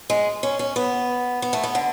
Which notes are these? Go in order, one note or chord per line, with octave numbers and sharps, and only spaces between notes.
G#3
C#4
C#4
B3
B3
A3
B3
D3